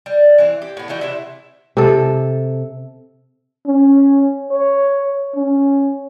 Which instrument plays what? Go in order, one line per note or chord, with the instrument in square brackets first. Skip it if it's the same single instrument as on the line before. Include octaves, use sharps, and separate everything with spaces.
[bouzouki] G3
E3 C4
G4
A2 B3
E3 G3 D#4 F#4
C3 D4 E4 E5
[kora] C3 A4
[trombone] C#4
C#5
C#4